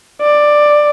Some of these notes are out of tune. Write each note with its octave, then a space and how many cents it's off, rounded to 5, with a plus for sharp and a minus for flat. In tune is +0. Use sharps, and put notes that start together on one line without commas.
D5 +10